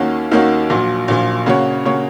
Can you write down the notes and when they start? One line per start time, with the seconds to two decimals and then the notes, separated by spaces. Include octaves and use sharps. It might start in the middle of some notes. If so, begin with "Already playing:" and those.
Already playing: D#2 D#3 A#3 C#4 F#4
0.31 D#2 D#3 A#3 C#4 F#4
0.70 A#1 A#2 F#3
1.08 A#1 A#2 F#3
1.46 C#3 A#3 F#4 C#5
1.85 C#3 A#3 F#4 C#5